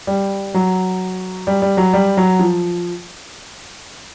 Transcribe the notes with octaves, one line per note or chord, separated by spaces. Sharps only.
G3
F#3
G3
G3
F#3
G3
F#3
F3